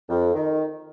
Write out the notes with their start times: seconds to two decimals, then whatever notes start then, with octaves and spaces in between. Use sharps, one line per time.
0.09 F2
0.34 D#3